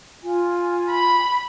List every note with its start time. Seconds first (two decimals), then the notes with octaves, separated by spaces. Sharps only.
0.23 F4 G#5
0.90 B5